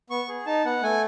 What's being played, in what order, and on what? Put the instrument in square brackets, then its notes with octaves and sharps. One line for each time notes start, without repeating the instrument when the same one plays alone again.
[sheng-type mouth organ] B3 C#6
G#4
D#4 A5
B3 F#5
A3 G#5